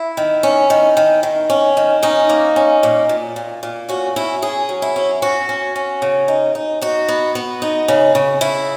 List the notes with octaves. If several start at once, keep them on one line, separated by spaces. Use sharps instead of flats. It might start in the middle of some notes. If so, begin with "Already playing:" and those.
Already playing: E4
D#3
C#4
D#3
D#3
D#3
C#4
D#3
C#4 D#4
A#3
C#4
A#2
A#2
A#2
A#2
C#4 F#4
C#4 E4
C#4 G#4
F#3
E4
C#4
C#4 F#4
C#4
C#4
C#3
D#4
D#4
D#4 F#4
B3
B3
D#4
C#3
C#3
C#3 E4